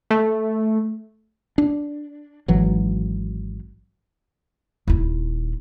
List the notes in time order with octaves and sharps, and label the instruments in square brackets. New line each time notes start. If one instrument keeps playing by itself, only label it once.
[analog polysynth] A3
[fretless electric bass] D4
G#1 E3 F#3
[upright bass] D#1 E4